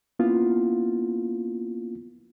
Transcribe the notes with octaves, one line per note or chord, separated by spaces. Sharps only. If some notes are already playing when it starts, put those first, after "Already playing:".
A#3 B3 C#4 E4 F4